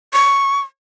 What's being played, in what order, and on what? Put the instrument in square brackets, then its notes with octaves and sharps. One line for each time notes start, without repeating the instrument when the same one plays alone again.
[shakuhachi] C#6